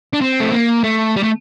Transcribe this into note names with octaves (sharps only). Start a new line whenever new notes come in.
D4
C4
A3
A#3
A3
G3
A3